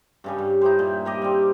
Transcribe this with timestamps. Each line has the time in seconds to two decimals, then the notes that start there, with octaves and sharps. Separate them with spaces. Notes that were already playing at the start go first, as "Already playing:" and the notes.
0.24 G2 C#3 G3
0.38 G2
0.61 D#4 E4 G4 C5
0.79 A#2
1.05 A#3 G4 D#5
1.22 G3 C4